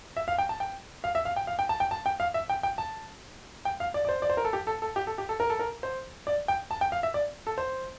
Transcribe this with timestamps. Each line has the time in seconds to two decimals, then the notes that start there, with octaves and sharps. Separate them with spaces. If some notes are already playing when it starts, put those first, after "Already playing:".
0.17 E5
0.28 F5
0.38 G5
0.49 A5
0.60 G5
1.04 F5
1.15 E5
1.25 F5
1.36 G5
1.47 F5
1.59 G5
1.69 A5
1.80 G5
1.91 A5
2.06 G5
2.20 F5
2.34 E5
2.49 G5
2.63 G5
2.78 A5
3.65 G5
3.80 F5
3.94 D5
4.05 D5
4.09 C5
4.22 D5
4.30 C5
4.37 A#4
4.45 A4
4.53 G4
4.67 A4
4.82 A4
4.96 G4
5.07 A4
5.18 G4
5.29 A4
5.40 A#4
5.50 A4
5.59 A#4
5.83 C5
6.27 D5
6.48 G5
6.71 A5
6.81 G5
6.92 F5
7.03 E5
7.14 D5
7.47 A4
7.58 C5